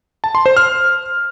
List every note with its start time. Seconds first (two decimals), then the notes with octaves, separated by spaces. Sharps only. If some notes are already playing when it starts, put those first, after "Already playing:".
0.24 A5
0.35 C6
0.46 C5
0.57 F6